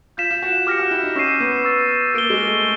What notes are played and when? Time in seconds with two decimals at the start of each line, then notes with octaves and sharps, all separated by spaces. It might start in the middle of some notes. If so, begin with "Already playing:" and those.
0.17 F4 G6 B6 E7
0.31 F4
0.42 F#4
0.67 G4 D6 F6 A#6 C#7
0.79 F#4
0.91 E4
1.03 D#4
1.15 C#4 C#6 E6 G6 C7 D#7
1.40 B3
1.64 C#6 E6 A6
2.14 A#3 A6 D7 G7
2.30 G#3
2.47 A3